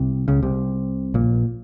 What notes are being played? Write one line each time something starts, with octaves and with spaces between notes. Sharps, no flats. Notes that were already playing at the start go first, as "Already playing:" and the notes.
Already playing: C2 C3
C#2 C#3
C2 C3
A#1 A#2